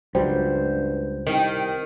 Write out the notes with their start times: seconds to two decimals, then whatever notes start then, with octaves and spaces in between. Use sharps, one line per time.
0.15 C#2 G2 F#3 G3 C5
1.27 C2 D#3